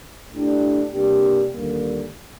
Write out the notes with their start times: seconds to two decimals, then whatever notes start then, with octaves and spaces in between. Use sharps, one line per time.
0.33 A2 A3 D4 G4
0.93 C3 G3 A#3 D4 G4
1.53 D#2 D3 G3 A#3